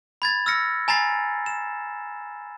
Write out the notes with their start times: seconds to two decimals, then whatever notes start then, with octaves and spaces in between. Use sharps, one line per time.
0.22 B5 G#6 A6
0.46 E6 F6 A#6 C#7
0.88 G#5 A#5 B5 A6 C7
1.46 E7